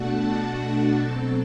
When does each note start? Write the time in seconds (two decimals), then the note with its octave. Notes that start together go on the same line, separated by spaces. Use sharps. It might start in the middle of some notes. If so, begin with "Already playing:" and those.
Already playing: B2 A3 D4 F#4 A4 F#5 A5
0.19 A4 A5
1.01 B2 F#3 C4